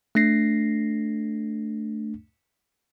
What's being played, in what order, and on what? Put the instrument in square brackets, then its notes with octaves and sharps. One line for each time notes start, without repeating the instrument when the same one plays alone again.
[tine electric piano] A3 D4 A#6 C7